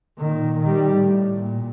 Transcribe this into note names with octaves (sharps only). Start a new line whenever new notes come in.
A#2 D#3
D#3 G3
A2
A#2